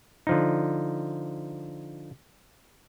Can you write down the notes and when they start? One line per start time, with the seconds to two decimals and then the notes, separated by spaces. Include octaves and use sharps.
0.27 D3 F3 D#4